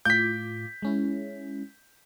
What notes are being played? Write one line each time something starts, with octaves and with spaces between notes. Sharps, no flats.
A2 F4 D6 G6 B6
G#3 C#4 E4